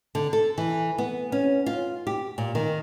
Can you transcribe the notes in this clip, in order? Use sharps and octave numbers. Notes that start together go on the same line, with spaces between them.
D3
A4
E3
B3
C#4
F4
G4
A#2
D#3